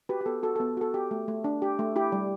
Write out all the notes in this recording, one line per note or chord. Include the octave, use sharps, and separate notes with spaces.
F#4 G4 B4
G4
B3 A4
F#4 A4
B3 A4
F#4 A4
G4
A3
A3
D4
G4
A3
E4 G4
G3